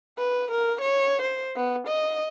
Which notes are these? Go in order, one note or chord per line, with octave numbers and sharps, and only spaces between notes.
B4
A#4
C#5
C5
B3
D#5